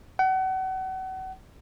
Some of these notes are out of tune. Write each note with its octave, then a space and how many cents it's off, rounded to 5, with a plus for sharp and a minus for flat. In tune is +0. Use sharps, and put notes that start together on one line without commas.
F#5 +35